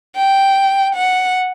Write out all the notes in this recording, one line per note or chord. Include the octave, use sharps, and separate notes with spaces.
G5
F#5